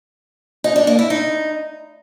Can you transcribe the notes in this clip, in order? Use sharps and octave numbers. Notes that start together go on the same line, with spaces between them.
D#4
D4
A#3
E4
D#4